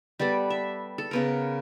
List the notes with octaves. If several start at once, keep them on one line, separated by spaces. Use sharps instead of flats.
G3 B3 A4 D5
E5
A4
C#3 B3 A#4